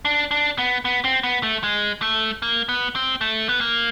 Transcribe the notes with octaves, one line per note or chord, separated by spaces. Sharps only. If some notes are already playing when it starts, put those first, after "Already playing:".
D4
D4
B3
B3
C4
B3
A3
G#3
A3
A#3
B3
C4
A3
B3
A#3